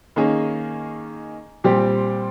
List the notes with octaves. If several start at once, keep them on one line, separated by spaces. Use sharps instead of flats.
D#3 A#3 C#4 G#4
A#2 G3 C4 G4